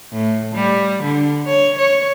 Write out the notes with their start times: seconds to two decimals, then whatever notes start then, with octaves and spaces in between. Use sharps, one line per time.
0.12 A2
0.55 G3
1.03 D3
1.47 C#5
1.78 C#5